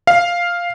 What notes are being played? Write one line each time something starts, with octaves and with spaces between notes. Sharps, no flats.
F5